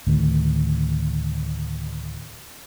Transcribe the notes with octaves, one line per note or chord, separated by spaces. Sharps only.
D2 A2 D#3